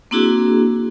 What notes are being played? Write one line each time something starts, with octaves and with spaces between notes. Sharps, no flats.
A#3 C4 D4 E4 F#4 G#4